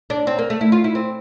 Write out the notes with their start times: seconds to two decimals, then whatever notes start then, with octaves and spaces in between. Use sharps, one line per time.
0.10 D4
0.27 C4
0.39 A#3
0.50 A3
0.61 E4
0.72 F4
0.84 E4
0.95 C4